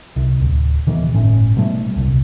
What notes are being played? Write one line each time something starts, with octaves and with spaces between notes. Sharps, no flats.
C2
D1
D#1 B2 D#3 E3
G1 A2 C#4
B2 G3 A3
D#1 C2